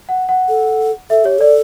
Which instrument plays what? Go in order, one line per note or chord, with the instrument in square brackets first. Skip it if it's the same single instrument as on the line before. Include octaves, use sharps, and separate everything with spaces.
[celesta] F#5
F#5
[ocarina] A4
[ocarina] A4 [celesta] E5
[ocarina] G4 [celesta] C#5
[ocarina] A4 [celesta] D5